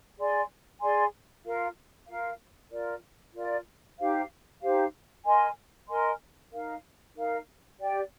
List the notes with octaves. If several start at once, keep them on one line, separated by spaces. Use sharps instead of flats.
G#4 D5 G#5 C6
G#4 D5 G#5 C6
F4 A#4 F5
F4 A#4 F5
F4 A#4 D5
F4 A#4 D5
D#4 G4 C5 F5
D#4 G4 C5 F5
A#4 D#5 G#5 C6
A#4 D#5 G#5 C6
D#4 A#4 F5
D#4 A#4 F5
G4 D5 G5